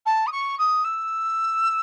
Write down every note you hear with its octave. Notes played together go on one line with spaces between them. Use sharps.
A5
D#6
C#6
D#6
E6